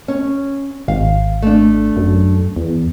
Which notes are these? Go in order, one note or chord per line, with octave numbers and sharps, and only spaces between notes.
C#4
G#1 F5
A3 D4
F#2
E2